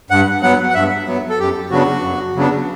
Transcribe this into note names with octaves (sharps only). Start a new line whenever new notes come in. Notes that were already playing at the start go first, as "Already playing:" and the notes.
G2 F#5
F#3 B3 F#5
F#5
G2 E5
F#3 B3
A4
F#2 G4
C#3 F#3 B3 D4 F#4
F#2
C#3 F#3 B3 D4